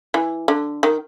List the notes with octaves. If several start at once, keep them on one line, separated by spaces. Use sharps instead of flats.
E3
D3
D#3